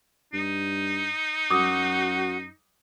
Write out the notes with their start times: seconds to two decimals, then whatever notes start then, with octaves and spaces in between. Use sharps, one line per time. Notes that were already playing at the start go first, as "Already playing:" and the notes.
0.33 G2 D#4
1.50 F#2 F#4 D6 D#6